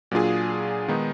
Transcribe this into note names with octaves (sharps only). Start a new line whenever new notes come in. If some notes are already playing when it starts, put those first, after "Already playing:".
A#2 F#3 D4 F4 G#4
D#3 G#3 B3 D#4